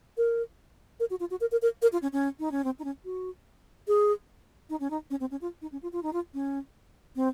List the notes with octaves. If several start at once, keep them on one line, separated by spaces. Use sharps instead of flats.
A#4
A#4
F#4
F4
F#4
A#4
A#4
A#4
A#4
F4
C#4
C#4
D#4
C#4
C4
D#4
C#4
F#4
G#4
D#4
C#4
D#4
C#4
C4
C#4
F4
D#4
C#4
F4
F4
D#4
F4
C#4
C4